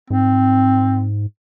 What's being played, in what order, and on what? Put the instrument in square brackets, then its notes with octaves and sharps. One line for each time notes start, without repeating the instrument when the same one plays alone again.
[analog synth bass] G#2 [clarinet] C4